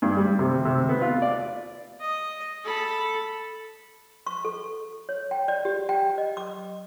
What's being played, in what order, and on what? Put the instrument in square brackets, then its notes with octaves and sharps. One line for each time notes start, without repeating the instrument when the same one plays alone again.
[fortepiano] G2
G3
C3
C3
B3
F4
D5
[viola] D#5
A4 B5
[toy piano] C#6
A4
C#5
G5
D5
G4
G5
D#5
D6